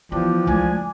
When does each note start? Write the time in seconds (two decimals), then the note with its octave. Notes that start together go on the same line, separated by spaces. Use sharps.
0.12 E3 F3 B3 D4 G4
0.47 C#2 A3 D4 G#5